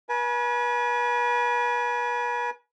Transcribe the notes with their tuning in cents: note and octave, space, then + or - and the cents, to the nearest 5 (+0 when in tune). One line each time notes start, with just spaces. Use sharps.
B4 -35 G#5 +25